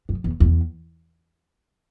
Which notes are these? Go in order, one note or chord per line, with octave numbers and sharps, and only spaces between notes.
F#2
E2
E2